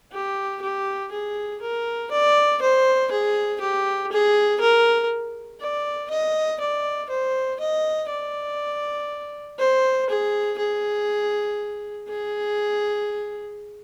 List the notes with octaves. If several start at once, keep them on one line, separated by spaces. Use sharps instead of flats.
G4
G4
G#4
A#4
D5
C5
G#4
G4
G#4
A#4
D5
D#5
D5
C5
D#5
D5
C5
G#4
G#4
G#4